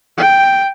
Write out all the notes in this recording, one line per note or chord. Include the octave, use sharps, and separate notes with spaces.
G5